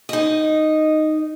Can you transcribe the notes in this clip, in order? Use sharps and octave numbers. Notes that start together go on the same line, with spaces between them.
D#4 D#5